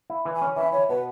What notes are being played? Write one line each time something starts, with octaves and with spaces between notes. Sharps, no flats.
E4
E3
G#5
C#4
E3 E5
E4 C#5
B2 B4